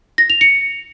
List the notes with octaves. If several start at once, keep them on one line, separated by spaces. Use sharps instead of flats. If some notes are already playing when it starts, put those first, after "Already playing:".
A#6
F7
C#7